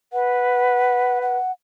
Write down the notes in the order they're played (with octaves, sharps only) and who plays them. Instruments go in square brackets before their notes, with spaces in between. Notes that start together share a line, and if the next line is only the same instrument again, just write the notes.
[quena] B4 [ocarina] F#5
[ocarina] F#5